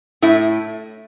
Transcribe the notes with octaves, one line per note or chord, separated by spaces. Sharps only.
A2 E4